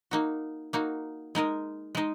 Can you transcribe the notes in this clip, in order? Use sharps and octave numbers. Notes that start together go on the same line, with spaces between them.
A#3 D#4 F#4
A#3 D#4 F#4
G#3 D#4 A#4 D#5
G#3 D#4 D#5